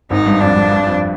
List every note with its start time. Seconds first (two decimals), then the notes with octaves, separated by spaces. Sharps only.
0.10 G#1 G#2 D#4
0.26 G2
0.40 F2 D4
0.56 G2
0.72 G2
0.87 F2